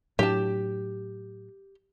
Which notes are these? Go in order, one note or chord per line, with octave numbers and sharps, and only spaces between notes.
A2 F#3 D4 G4 A5